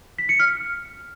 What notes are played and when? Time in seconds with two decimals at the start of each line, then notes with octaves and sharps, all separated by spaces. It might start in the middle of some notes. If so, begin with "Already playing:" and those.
0.18 B6
0.29 C#7
0.40 F6